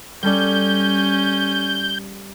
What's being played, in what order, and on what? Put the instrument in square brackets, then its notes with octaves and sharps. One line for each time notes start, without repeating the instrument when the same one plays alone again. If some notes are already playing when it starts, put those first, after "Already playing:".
[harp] G3 A4 D5 [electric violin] C#4 [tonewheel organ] G6